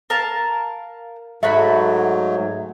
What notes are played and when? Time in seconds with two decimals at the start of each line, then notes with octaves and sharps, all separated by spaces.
0.10 A#4 F5 A5
1.43 G#2 F#3 A3 F#4 E5 B5